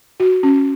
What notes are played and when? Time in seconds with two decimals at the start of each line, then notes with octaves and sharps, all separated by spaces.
0.20 F#4
0.43 C#4